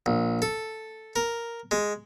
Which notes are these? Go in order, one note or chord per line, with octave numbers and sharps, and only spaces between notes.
A#1
A4
A#4
G#3